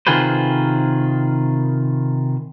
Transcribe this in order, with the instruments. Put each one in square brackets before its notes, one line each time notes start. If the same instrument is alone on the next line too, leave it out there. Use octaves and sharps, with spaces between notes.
[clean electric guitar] C3 D#3 F4 G#4 B4 C5